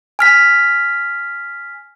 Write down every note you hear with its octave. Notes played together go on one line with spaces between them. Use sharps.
G#5 F6 B6